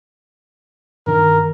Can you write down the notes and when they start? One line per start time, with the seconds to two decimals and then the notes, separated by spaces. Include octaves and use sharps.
1.07 G2 D#3 A#4